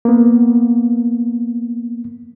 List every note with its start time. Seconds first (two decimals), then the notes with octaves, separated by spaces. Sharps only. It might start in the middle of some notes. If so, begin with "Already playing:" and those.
0.05 A#3 B3